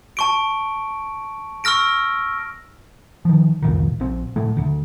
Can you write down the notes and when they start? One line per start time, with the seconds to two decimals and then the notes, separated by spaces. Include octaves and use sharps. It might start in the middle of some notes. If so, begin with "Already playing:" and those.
0.17 A5 C#6 D7
1.64 C#6 E6 F6 A#6 D7
3.25 D#3 F3
3.62 C2 F2 A#2 D#3
4.00 A#1 C4
4.36 A2 F#3 A3
4.57 D2 D3